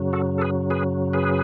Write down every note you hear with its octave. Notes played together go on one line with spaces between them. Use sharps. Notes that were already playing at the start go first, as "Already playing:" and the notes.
Already playing: F#2 C#3 F#3
F#4 A4
A4
G#4 B4
G#4 B4
G#4 B4